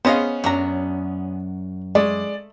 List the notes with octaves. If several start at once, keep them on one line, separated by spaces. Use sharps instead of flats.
B3 C#4 G#4 C5 D#5 F5
F#2 F#3 D4 A#5
G#3 A3 D5